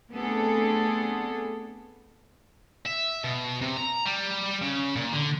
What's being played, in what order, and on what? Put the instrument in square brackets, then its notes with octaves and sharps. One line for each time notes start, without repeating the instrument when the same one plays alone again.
[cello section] A3 B3 C4 D4 G#4 A4
[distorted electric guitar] E5
B2
C3
A#5
G3
C#3
A#2
D3